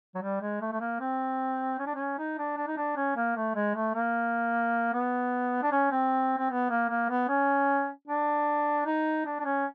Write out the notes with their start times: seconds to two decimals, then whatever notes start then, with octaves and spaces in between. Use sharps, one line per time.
0.15 F#3
0.22 G3
0.41 G#3
0.61 A3
0.72 A3
0.80 A#3
1.00 C4
1.79 C#4
1.86 D4
1.95 C#4
2.18 D#4
2.38 D4
2.57 D4
2.67 D#4
2.77 D4
2.96 C#4
3.16 A#3
3.36 A3
3.55 G#3
3.75 A3
3.94 A#3
4.93 B3
5.63 D4
5.72 C#4
5.91 C4
6.38 C4
6.51 B3
6.70 A#3
6.89 A#3
7.10 B3
7.28 C#4
8.08 D4
8.86 D#4
9.25 D4
9.39 D4
9.45 C#4